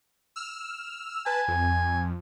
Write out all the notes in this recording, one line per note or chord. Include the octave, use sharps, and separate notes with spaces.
E6 F6
B4 G#5 A5
F2